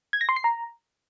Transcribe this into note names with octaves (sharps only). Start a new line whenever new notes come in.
G#6
A#6
C6
C7
A#5